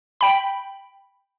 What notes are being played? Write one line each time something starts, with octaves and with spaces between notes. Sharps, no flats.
G5 B5